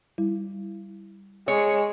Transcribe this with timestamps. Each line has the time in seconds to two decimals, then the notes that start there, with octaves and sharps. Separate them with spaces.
0.18 G3 E4
1.48 G#3 C#5